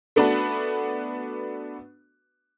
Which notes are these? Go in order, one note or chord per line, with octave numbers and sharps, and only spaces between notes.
A3 B3 D4 F#4 B4